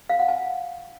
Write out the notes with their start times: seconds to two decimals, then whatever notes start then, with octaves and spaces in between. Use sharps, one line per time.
0.09 F5
0.19 F#5
0.28 G#5